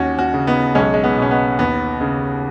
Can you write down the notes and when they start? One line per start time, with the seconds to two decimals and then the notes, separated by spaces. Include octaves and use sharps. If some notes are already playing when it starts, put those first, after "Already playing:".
Already playing: D#2 C#4 F#4
0.19 C#4 F#4
0.34 C#3
0.47 B3 D#4
0.75 B1 G#3 C#4
0.94 G#3
1.04 B3
1.18 B2 C#4
1.31 B3
1.59 D#2 B3
2.01 C#3